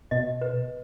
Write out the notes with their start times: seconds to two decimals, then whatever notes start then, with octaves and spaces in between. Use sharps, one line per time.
0.11 B2 D#5
0.41 B4